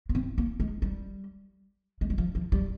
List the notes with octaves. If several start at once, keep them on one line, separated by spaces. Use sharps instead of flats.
A#3
C4
A#3
G#3
G3
G#3
G3
F3
F3
G3